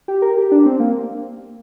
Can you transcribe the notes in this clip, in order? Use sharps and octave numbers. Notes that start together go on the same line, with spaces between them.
G4
A#4
G4
D4
C4
A#3